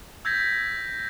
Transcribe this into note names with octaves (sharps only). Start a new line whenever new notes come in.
E6 G6 G#6 A#6 B6